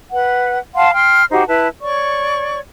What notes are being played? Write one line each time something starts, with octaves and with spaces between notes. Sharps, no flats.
B4 F#5
F5 F#5 A5 C6
G5 C6 F6
D#4 F#4 G4 C5
E4 B4 A5
C#5 D5 C#6